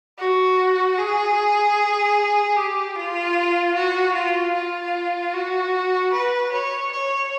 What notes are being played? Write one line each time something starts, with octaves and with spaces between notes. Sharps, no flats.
F#4
G#4
G4
F4
F#4
F4
F4
F#4
B4
C#5
C#5